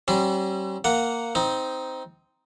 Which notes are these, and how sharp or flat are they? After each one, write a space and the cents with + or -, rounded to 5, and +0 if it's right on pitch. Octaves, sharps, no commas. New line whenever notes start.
G3 -35 C#4 -45 C6 -40
A#3 -5 F#5 +0
C4 -10 D#4 +10